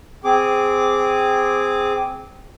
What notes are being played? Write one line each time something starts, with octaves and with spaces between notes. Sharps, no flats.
C4 G#4 D6